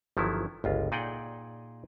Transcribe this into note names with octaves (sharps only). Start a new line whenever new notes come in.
G1 D#3 F3 F#3 E4
G1 C#2 F4
A#2 D#4 G#4 D5 F#5 G5